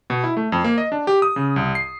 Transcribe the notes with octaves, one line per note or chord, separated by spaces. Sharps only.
B2
E4
A3
F2
A#3
D#5
D4
G4
D#6
C#3
C2
C7